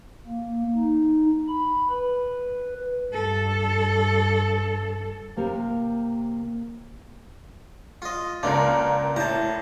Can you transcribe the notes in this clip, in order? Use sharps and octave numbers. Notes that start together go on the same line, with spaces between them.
A#3
D#4
B5
B4
G2 A4
C3 A#3 G4 A#4
F4 D#5
C#2 A#3 D4 A#4
A2 A5 A#5